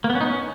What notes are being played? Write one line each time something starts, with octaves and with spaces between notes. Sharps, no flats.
A#3
B3
C#4
D#4
C#4